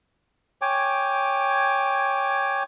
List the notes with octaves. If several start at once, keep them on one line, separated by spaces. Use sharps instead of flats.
C#5 G5 G#5 D6